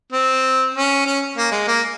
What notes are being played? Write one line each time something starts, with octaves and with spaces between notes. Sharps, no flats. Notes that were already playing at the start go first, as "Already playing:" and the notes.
C4
C#4
C#4
A#3
G#3
A#3